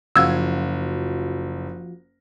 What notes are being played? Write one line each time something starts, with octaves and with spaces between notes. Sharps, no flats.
F#1 F3 F4 F#4 E6 G#6